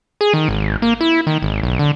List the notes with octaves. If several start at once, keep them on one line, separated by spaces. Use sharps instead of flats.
G#4
D#3
G#1
A#3
E4
D#3
G#1
B1
D3